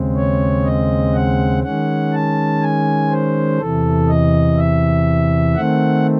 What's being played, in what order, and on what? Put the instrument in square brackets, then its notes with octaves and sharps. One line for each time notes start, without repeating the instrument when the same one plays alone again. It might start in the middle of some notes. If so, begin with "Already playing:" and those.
Already playing: [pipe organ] D#2 C#3 G#3 C4
C#5
D#5
F#5
D#3 G#3 C#4 F#5
A5
G#5
C5
E2 C3 E3 A4
D#5
E5
D#3 A3 C4 F#5